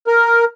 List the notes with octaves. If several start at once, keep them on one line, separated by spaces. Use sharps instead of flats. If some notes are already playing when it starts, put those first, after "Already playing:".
A#4